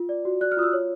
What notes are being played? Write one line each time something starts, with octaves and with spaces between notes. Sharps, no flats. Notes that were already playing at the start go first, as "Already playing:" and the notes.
Already playing: F4
D5
F#4
D5 F#6
F6
F4 D#6
E6
C#5